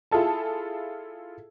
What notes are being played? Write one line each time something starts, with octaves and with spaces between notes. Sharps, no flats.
E4 F4 G#4 A4 A5